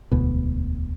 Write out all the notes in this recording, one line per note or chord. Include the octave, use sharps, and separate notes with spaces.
E1 D2 B2